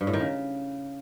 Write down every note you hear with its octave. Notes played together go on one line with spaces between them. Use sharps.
G2
A2
D#3
C#3